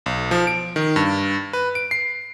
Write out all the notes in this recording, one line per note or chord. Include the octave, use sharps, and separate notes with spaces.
B1
F3
D7
D#3
G2
B4
D7
C7